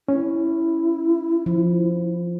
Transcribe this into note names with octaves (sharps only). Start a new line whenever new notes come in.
C#4 E4
F3